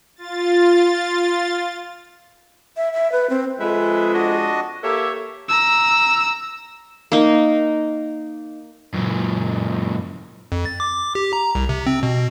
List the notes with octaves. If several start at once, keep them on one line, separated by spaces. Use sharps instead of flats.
F4 A6
E5
E5
B4
C4
F2 G#3 B4 E5
D4 F#4 D#5
A#3 G4 A4 C#5 E5
A#5 E6
A#3 D#4
F#2 A#2
F2
A6
D6
G4
A#5
C2
C3
C4
B2